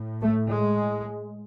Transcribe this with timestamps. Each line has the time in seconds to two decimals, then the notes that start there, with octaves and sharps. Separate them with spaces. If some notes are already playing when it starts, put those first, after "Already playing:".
Already playing: A2
0.21 A3
0.50 G#3